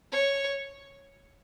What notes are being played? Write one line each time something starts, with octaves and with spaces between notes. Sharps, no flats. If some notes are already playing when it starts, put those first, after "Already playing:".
C#5